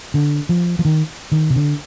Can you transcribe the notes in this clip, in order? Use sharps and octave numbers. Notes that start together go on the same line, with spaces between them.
D3
F3
F3
D#3
D#3
C3
D3